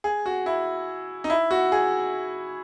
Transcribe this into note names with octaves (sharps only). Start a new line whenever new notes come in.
G#4
F#4
E4
D#4
E4
F#4
G#4